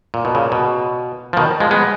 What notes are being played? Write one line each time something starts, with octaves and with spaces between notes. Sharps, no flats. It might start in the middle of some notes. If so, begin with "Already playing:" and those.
A#2
B2
A#2 C#3
B2
F3
B2 D#3
F3 G#3
G#3 B3